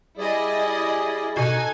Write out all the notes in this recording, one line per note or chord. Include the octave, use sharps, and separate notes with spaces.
G3 E4 G#4 D5 D#5
B2 D#4 A4 G#5 F#6